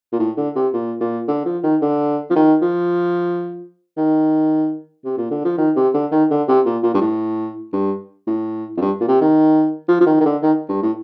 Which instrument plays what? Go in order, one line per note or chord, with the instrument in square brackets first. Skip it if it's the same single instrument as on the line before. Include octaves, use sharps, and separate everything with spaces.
[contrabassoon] A#2
A2
D3
C3
A#2
A#2
D3
F3
D#3
D3
F3
D#3
F3
D#3
C3
A#2
D3
F3
D#3
C3
D3
D#3
D3
C3
A#2
A#2
G2
A2
G2
A2
F2
G2
A#2
C3
D#3
F3
F3
D#3
D#3
D3
D#3
G2
A2